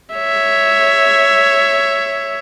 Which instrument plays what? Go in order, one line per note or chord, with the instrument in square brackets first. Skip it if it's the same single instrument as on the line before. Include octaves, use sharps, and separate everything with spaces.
[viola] C#5 E5